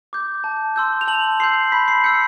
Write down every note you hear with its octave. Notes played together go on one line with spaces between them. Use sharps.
D6 G6
A5
C6 E6 G6
F7
A5 F#7
C6 E6 G6 C7
B5 B6
C7
E6 G6 C#7